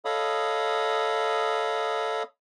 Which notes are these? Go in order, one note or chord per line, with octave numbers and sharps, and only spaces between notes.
A4 C#5 D#5 F5 B5 D#6